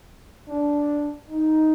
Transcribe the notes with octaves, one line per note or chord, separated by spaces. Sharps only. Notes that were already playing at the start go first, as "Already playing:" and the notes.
D4
D#4